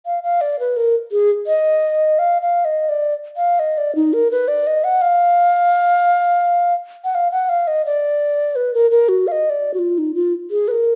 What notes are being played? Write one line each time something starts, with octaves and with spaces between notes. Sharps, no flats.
F5
F5
D5
B4
A#4
G#4
D#5
F5
F5
D#5
D5
F5
D#5
D5
D#4
A#4
B4
D5
D#5
F#5
F5
F#5
F5
F#5
F5
D#5
D5
B4
A#4
A#4
F#4
F5
D#5
D5
F#4
F4
D#4
F4
G#4
B4
A#4